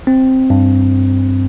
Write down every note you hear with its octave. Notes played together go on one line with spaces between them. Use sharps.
C4
G2